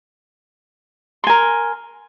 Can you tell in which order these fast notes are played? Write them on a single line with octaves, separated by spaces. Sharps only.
C6 G#5 A#4